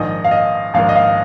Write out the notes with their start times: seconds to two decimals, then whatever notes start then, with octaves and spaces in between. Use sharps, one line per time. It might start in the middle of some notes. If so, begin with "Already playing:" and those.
Already playing: A#1 G#2 D#3 D#5
0.24 F5
0.31 D#5
0.74 A#1 G#2 D#3 F5
0.89 D#5
0.95 F5